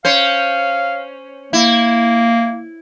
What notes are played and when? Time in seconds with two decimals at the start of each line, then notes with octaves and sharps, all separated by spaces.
0.05 C#4 C5 F5
1.53 A#3 E4